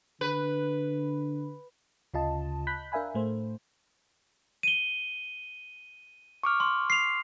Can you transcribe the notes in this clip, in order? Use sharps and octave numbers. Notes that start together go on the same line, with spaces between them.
D3 B4
D2 C#3 F4 D#5 A5
B5 F#6 G6 B6
D4 A#4 E5 F5 G#5 B5
A2 A3 C5
D#7 G7
C#6 D6 F6
C6
C7 F7